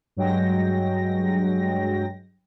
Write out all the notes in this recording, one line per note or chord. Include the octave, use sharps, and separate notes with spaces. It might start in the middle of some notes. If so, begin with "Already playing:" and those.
G2 F#3 G#3 G5 A#6